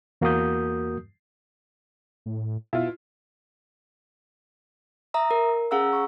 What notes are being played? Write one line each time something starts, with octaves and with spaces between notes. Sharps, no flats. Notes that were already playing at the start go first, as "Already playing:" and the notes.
E2 A#3 F#4 A#4 D#6 G6
A2
B2 E4 F4
E5 A#5 D#6
A#4
C#4 G#4 F5 F#5 A#5 E6
C#6